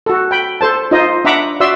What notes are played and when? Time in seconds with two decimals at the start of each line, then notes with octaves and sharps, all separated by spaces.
0.06 F#4 A4
0.31 G5 B5
0.61 A4 C5 A5
0.91 D#4 F4 C5 D#5
1.25 D4 E5 F#5 A#5 B5 D6
1.60 F#4 D5 E5 C6 E6